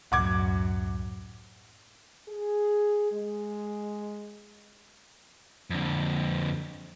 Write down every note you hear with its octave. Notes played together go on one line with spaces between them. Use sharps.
C#2 F#2 A2 F#5 D6 G#6
G#4
G#3
F2 D3